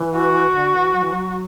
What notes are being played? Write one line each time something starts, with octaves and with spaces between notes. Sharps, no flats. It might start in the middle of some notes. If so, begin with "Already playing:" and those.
Already playing: E3
F#4
E3
D3
E3
F#3
E3
F#3